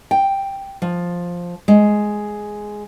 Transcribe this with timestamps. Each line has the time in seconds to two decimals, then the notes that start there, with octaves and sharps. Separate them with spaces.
0.11 G5
0.82 F3
1.68 G#3